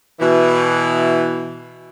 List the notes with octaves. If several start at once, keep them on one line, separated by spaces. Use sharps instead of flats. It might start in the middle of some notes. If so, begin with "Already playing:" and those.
B2 E3